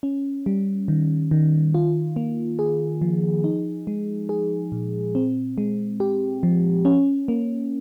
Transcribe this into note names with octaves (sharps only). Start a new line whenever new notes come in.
C#4
G3
D#3
D#3
F4
A#3
G#4
F3
D#4
G#3
G#4
A#2
C4
G#3
G4
F3
C#4
A#3